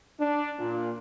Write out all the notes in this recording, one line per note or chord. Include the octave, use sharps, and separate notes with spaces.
D4
A#2